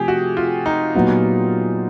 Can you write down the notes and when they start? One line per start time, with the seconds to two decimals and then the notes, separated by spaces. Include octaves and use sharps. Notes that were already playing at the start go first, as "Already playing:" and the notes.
Already playing: C3 F3 A3 G4 G#4
0.08 F#4
0.37 F4
0.66 D#4
0.95 A#2 F#3 B3